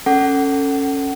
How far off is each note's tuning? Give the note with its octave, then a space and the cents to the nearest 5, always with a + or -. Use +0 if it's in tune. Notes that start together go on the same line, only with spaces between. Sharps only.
C#4 -10 A4 +15 F#5 +30